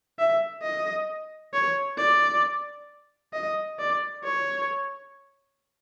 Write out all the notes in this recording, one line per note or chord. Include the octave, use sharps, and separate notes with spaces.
E5
D#5
C#5
D5
D#5
D5
C#5